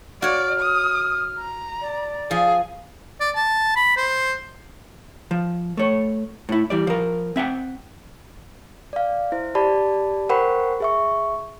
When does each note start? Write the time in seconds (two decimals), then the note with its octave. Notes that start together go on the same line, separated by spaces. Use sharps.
0.22 F#4 C#5 D5 F6
0.60 D#6
1.39 A#5
1.81 D5
2.31 F3 G#4
3.20 D5
3.35 A5
3.76 B5
3.97 C5
5.31 F3
5.77 A3 C#5
6.49 A2 E4
6.70 E3 G3 D5
6.87 F3 A#4
7.36 C4 E5 F#5 G5
8.93 D5 F5
9.32 E4 C5
9.55 G4 D5 A5 B5
10.29 A#4 C5 F#5 G5 B5 C#6
10.80 G#4 E5 C#6